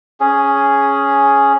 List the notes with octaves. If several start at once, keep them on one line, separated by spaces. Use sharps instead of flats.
C#4 G#4